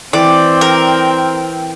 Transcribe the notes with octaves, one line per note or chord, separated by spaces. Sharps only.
E3 C4 D5 G5
A#4